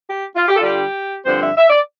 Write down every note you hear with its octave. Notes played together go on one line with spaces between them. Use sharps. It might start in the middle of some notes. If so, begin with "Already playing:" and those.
G4
F4
G4
A4
D3 G3 D4 F4 G4
G2 D3 F3 C4 C5
E5
E5
D5